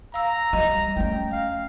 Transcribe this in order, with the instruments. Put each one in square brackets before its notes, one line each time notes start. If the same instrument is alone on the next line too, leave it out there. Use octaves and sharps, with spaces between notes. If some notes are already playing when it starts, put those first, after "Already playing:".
[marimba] F5 E6 [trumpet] A#5
[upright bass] G3 [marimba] D#5
[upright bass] A3 C#4 [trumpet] G5
[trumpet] F5